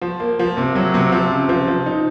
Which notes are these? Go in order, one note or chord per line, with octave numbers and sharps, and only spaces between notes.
F3
A#3
F3
C3
F#3
C3
F3
C#3
F3
F3
D#4